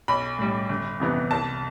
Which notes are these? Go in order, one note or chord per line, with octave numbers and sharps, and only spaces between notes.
B1 B5
A2 G3
G1
F2 C3 E3 B3
C2 A5